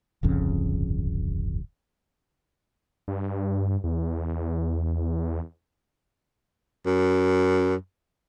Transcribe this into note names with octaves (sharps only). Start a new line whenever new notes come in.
D1 G1 F2 C#3
G2
E2
F#2